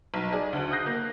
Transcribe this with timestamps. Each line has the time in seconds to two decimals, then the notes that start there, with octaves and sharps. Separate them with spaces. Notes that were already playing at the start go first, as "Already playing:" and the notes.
0.14 B1
0.33 G#4 D5
0.53 D2 F#4
0.71 D#6 F#6 G6 A#6 C7
0.86 A#3